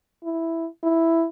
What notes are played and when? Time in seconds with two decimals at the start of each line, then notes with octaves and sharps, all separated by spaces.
0.24 E4
0.83 E4